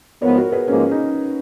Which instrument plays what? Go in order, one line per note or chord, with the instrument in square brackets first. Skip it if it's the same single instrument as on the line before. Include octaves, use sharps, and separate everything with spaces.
[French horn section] G#2 F3 B3 [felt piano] A#4 C#5
[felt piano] F#4 A#4
G#4 B4
[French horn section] G#2 F3 A#3 D#4 G#4 [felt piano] C#4
[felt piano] D#4